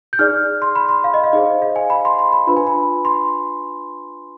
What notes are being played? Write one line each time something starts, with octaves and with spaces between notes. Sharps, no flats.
G6
D#4 G#4 D5 F6
C6
B5
C6
F5
D#5
F5
D#4 G#4 C5 D#5
F5
G#5
B5
C6
C6
B5
D4 F4 B4 B5
G#5
B5
C6